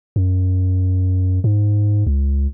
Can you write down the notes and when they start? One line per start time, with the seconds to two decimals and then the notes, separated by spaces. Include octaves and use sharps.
0.16 F#2
1.44 G#2
2.07 C#2